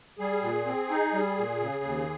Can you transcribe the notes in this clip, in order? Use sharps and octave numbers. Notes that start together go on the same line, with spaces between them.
G3 G#4
A#2
C4
D#4
G3
A#2
C#3
D#2